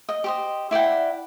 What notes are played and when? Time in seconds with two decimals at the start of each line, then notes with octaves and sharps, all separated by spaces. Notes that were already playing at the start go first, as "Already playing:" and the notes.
0.09 D#5
0.24 G4 C5 D#5
0.71 E4 D5 F#5 G5